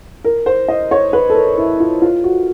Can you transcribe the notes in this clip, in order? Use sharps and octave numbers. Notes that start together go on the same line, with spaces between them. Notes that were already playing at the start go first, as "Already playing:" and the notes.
A#4
C5
D#5
C#5
B4
A4
A#4
E4
F4
F4
F#4